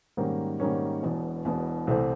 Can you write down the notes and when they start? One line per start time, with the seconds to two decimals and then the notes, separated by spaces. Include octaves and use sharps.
0.17 G#2 D#3 G3 A#3 C#4
0.60 G#2 D#3 G3 A#3 C#4
1.03 E1 E2 B2
1.45 E1 E2 B2
1.87 C2 C3 E3 A3 C4